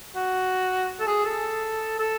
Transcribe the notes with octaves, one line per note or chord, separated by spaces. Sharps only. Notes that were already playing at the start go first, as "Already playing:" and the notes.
F#4
A4
G#4
A4
A4